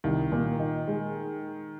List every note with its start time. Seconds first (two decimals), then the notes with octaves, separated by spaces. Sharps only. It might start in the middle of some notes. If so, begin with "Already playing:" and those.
0.04 C2 D#3
0.32 A#2
0.59 D#4
0.88 G#3